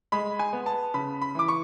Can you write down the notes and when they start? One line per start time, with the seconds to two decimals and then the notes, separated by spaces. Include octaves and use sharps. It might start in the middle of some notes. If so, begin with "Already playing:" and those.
0.12 G#3 B5
0.39 G#5
0.53 B3
0.66 A5
0.94 C#3 B5
1.22 B5
1.35 E3 D6
1.48 C#6